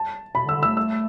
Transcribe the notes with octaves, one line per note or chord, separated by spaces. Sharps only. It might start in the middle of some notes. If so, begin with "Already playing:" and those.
Already playing: A5
B2 B5
D3
E6
D3
A3 E6
E6